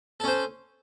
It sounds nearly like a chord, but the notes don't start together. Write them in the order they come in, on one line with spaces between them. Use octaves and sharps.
A4 C#4 C5